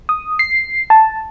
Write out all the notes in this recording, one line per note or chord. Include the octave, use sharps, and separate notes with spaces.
D#6
C7
A5